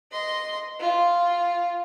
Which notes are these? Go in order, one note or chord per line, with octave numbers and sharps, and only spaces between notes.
D#5 C6
F4